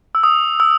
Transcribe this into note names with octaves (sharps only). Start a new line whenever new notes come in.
E6
D#6
E6